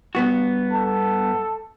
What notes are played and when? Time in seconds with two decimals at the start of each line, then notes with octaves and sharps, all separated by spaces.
0.15 G2 B3 F#4
0.70 A4